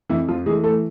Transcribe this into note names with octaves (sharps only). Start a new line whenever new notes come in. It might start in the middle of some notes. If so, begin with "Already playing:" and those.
F2 E3 E4
F3 F4
E3 G#3 A3 G#4
A3 A4